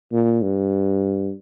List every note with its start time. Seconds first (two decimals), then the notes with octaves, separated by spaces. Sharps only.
0.12 A#2
0.42 G2